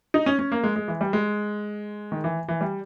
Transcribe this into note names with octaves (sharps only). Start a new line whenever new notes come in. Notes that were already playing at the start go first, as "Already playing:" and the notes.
D#4
C#4
C#4
A#3
G#3
G#3
E3
G3
G#3
D#3
E3
E3
G3